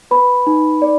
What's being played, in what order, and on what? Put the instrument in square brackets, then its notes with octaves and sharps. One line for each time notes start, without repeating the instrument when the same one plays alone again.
[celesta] B4 B5
D#4
D5